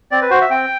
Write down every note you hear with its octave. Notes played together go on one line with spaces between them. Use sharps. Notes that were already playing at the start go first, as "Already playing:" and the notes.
C4 D5
B4
F#4 C5
E5
C4 G5